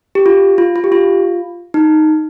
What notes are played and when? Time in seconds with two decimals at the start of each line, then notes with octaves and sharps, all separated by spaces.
0.15 G4
0.26 F4
0.58 F4
0.76 F4
0.84 G4
0.92 F4
1.74 D#4